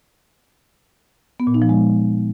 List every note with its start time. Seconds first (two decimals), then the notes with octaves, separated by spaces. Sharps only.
1.40 B3
1.47 A#2
1.54 D#4
1.62 F3
1.69 G#3